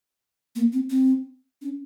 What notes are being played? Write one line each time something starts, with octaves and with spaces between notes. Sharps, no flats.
A#3
C4
C4
C#4